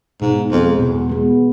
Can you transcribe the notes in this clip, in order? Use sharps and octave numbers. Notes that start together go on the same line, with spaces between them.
G#2 B2
F2 G#3 B3
E2 B2
G#3 B3